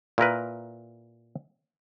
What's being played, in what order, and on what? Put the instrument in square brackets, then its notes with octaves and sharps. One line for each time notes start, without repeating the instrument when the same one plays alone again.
[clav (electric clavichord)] A#2 E4 A#4 B4